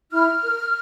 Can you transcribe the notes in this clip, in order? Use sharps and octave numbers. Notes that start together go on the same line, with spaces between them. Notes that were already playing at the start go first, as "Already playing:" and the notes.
E4 F6
A#4